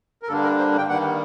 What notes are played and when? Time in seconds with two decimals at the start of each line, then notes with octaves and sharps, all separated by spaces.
0.23 A#4
0.28 G2 D3 G3 A#3 D4 A4
0.43 A#4
0.58 C5
0.78 G5
0.88 G2 D#3 G3 A#3 F#5